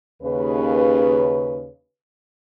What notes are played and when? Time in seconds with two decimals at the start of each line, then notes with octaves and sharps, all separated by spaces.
0.23 D#2 C#3 B4